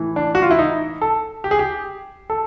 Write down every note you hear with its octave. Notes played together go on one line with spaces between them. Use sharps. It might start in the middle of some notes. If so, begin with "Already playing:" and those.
Already playing: A2 E3
D4
F#4
F4
E4
D#4
A4
G4
G#4
G4
A4